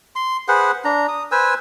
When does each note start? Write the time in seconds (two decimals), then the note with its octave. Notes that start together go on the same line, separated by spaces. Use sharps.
0.16 C6
0.48 G#4 B4 C5 F#5
0.85 D4 A#5
1.08 D#6
1.32 B4 C5 G#5 E6